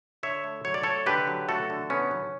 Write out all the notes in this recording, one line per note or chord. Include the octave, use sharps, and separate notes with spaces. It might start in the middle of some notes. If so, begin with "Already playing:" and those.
D3 C#5 E5
A3
F#3 C#5
D5
A3 A4 C#5
D3 G4 B4
F#3
A3 F#4 A4
D3
B3 C#4
F#3